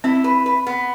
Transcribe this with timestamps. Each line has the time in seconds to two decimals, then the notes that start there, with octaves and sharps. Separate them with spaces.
0.04 C4 E4
0.24 B4
0.46 B4
0.67 B3